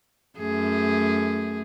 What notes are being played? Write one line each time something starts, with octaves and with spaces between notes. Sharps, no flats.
F#2 A3 G#4